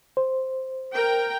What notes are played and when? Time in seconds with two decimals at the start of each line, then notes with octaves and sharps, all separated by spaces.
0.17 C5
0.95 A#4 G5